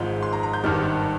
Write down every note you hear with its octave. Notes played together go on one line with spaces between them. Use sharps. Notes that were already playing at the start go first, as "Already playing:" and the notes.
Already playing: G#1 G#2 F3 G#3 F5
C6
A#5
A#5
G6
G#1 G2 D#3 G3 F6